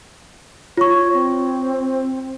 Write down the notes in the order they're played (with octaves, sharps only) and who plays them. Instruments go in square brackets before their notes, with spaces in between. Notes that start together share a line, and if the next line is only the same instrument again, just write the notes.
[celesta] F4 C#6 [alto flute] C#5
[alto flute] C4